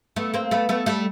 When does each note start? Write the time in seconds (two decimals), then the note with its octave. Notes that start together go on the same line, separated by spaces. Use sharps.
0.16 A3 B3
0.34 A#3 C4
0.51 A3 B3
0.69 A3 B3
0.86 G3 A3